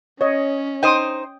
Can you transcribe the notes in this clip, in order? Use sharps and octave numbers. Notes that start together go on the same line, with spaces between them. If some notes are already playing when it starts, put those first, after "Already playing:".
C#4 C#5 D#5
D#4 C5 G5 D#6